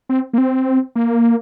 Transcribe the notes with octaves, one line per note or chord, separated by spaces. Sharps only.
C4
A#3
C4
A#3